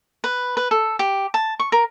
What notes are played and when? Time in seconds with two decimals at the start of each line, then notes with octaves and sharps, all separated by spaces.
0.24 B4
0.57 B4
0.71 A4
0.99 G4
1.34 A5
1.60 C#6
1.72 A#4